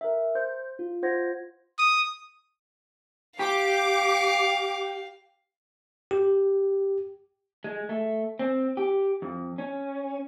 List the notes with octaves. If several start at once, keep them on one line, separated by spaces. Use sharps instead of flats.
A#4 E5
C5 G6
F4
F4 C5 F#5 G#6 A#6
D#6
G4 F5 D6
G4
G#3
A3
C4
G4
F2
C#4